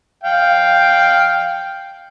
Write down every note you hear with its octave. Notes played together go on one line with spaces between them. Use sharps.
F5 G5